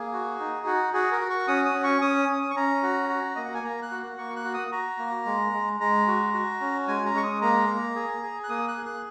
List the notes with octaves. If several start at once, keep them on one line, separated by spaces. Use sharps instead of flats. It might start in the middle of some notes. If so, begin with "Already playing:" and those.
Already playing: A#3 G#4
F#4
D#4
F#4
F#4 G#4
A#4
F#4
C#6
C#4 D#6
D#6
C#4
C#6
C#4 D#6
C#4
C#6
C#4 A#5
F#4
F#4
A#3 D#5
F#5
G#5
A#3 A#5
F#6
F#4
A#3 C#6
F#6
F#4
D#6
F#4 A#5
A#3
G#3
G#3
G#3 A#5
F#4
F#4
C#4
G#3 G#5
A#5
G#3 C#6
D#6
A#3 A#5
A#3
G#4
G#4
F#6
A#3 D#6
F#6
G#4
F#6